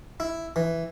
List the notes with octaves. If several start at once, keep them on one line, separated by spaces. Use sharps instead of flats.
E4
E3